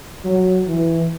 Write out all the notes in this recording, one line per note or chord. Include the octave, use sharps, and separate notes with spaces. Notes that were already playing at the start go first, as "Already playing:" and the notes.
F#3
E3